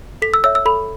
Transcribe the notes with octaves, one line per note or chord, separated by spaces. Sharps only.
A4 B6
E6
C#5 E5 E6
E6
A4 B5